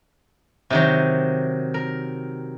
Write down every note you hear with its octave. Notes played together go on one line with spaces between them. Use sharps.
C3 D#3 F#3
A#4